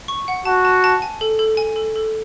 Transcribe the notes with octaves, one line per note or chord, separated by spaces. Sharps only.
C#6
F#5
F#4 A5
A5
A5
G#5
A4
A4
G#5
A4
A4